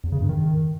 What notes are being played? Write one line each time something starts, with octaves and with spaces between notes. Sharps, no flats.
E2
C#3
G2
D#3